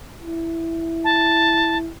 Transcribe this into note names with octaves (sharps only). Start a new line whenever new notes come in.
E4
A5